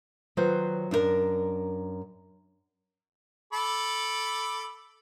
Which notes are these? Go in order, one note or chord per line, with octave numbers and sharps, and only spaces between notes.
D#3 F#3 F4 B4 C5
F#2 D4 E4 A#4
A4 B5 D6